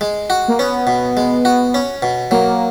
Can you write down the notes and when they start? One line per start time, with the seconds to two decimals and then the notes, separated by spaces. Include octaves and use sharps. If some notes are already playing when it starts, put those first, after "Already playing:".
0.01 G#3
0.30 F#4
0.48 A#3
0.59 B3 C#4
0.87 B2
1.17 G#3
1.45 F#4
1.74 C#4
2.02 B2
2.31 F#3 A#3